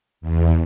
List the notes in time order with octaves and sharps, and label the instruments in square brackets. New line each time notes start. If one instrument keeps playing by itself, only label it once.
[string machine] E2